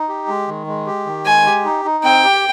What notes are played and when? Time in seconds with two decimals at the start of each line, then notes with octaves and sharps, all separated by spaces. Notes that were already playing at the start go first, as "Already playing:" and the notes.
Already playing: D#4
0.09 G4
0.28 G#3
0.48 D#3
0.67 G#3
0.87 G4
1.06 D#3
1.26 G#3 G#5
1.45 G4
1.65 D#4
1.85 D#4
2.04 C4 G5
2.23 G4